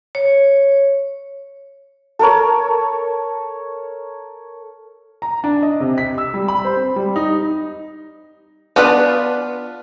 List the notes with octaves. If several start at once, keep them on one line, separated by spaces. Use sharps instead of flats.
C#5
A4 A#4 C#5
A#5
D4
D#5
C3
B6
E6
G3
B5
C5
C4
G3
D#4
B3 D4 F4 B4